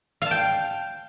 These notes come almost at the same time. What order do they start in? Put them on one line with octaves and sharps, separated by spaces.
F5 A5 G5